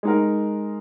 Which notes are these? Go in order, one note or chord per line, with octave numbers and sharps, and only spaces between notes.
G#3 D#4 A#4